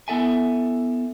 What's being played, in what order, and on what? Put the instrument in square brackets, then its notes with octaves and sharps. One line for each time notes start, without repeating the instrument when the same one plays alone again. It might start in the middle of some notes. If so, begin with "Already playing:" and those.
[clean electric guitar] B3 E4 A4 E5 G#5